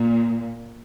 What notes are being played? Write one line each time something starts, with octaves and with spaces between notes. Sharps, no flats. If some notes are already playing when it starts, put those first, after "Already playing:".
Already playing: A#2